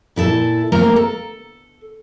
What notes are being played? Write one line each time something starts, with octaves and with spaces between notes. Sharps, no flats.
A#2 E4 A4 A5
A3 A#3 C4 G4 A#4 A#5
A4